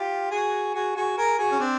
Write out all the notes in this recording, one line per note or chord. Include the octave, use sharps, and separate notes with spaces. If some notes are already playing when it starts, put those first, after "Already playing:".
Already playing: F4 G4
F#4 G#4
F#4 G#4
F#4 G#4
G#4 A#4
F#4 G#4
C#4
C4 D4